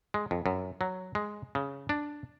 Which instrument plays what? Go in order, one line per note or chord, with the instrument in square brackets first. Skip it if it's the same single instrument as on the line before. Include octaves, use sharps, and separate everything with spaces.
[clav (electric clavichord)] G#3
F2
F#2
F#3
G#3
C#3
D4